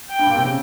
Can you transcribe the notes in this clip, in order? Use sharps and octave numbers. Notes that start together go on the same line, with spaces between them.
G5
G2
A#2
C3
C#3